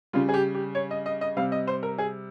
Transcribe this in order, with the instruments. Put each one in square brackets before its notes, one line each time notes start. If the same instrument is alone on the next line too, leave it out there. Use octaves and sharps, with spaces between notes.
[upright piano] C#3 G3 F4
G#4
G4
G4
C#5
D#5
D#5
D#5
C3 G3 F5
D#5
C5
A#4
G#4